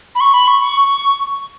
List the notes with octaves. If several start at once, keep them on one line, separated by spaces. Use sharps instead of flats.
B5
C#6
B5
C#6
C#6